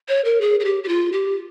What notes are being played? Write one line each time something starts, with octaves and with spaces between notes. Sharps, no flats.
C#5
A#4
G#4
G#4
G4
G4
F4
G4